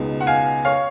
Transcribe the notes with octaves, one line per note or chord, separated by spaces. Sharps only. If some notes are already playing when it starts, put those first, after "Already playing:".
Already playing: C#2 B2 G#3 B3 D#4
F#5
F5 G#5
C#5 F5